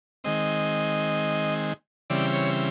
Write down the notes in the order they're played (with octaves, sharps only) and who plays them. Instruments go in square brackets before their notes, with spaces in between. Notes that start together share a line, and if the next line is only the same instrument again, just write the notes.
[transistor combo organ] D#3 G#3 C4 D#5
C#3 E3 G3 C4 D5
C#5